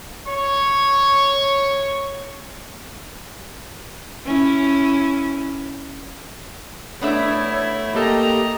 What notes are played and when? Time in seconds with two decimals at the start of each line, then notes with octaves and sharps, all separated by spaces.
0.27 C#5 C#6
4.26 C#4 E4
7.01 A3 B3 D4 E4 C#5 E5
7.95 A#3 G4 A4 D#5 A#5